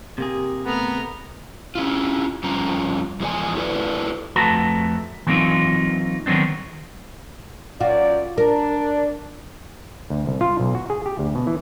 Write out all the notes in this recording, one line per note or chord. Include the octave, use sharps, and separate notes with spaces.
C3 A#3 G4 G#4
A3 B3 A#5 F6
C#4 E4 F4
F2 G3 C#4 F4 A#5
E2 F3 G#3 D5 G#5
E4 F#4 A4 B4 D5
F2 A3 F#4 B4 A5 A#5
E3 F#3 A#3 C4 D#4 F4
D#3 F#3 B3 C4 D4
F#2 F4 F#4 D5
D4 A#4
D2
C2
F4
B1
F#4
G#4
G4
D2
B2
E3